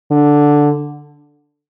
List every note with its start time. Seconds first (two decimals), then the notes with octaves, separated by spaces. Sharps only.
0.11 D3